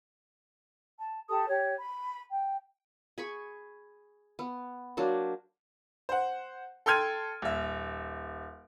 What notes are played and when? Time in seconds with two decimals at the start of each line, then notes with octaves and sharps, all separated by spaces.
0.98 A5
1.29 G4 A4 A5 D#6
1.48 G4 C#5
1.79 B5
2.30 G5
3.18 G#4 B5 C#6
4.39 B3
4.97 F#3 A#3 D4 C5
6.09 C5 F#5
6.86 A4 G5 C6 F6 G#6 D#7
7.42 D#1 E5